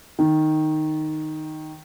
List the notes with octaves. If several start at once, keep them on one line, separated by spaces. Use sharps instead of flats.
D#3